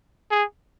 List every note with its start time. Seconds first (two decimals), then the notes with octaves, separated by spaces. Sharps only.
0.31 G#4